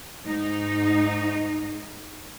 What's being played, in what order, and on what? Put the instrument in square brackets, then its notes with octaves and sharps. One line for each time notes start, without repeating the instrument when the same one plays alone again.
[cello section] G#2 G#3 D#4